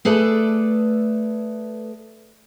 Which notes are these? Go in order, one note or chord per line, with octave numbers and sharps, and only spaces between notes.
A3 G#4 A4 B4 D5